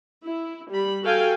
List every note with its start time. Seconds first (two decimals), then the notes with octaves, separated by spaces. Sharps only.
0.23 E4
0.71 G3 B5
1.03 F#4 A4 F5 G5 G#5